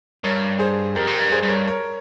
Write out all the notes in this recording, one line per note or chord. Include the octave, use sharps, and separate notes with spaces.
G2 A#4 C#5
G#4 C5
F2 G4 A#4
G#2
G4 A#4
G2
G#4 C5
G2
A#4 C#5
A#4 C#5